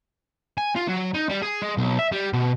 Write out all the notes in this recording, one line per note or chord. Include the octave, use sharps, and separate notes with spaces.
G#5
F4
F#3
D#4
G3
G#4
G#3
B1
E5
G3
B2